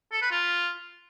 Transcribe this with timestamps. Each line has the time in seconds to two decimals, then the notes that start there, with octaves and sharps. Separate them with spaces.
0.12 A4
0.22 B4
0.31 F4